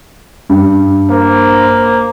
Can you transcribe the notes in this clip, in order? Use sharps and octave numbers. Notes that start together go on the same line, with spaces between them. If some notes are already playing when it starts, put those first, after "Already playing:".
G2
A#3 C5